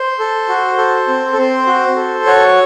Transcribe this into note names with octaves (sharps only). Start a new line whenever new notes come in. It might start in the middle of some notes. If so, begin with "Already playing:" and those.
Already playing: C5
A4
F#4
A4
C4
A4
C4 C5
F#4
A4
F#4 C#5